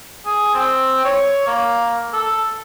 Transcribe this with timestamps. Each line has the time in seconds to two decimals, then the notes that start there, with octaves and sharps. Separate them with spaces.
0.26 G#4
0.54 C4
1.05 C#5
1.47 A#3
2.13 A4